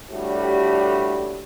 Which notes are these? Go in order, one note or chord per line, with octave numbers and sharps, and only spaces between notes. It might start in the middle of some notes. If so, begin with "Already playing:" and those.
A2 D3 G3 F#4 G4